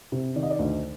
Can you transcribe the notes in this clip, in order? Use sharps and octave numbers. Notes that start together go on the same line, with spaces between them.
C3
D#3 D5
D#5
D5
D2 D#5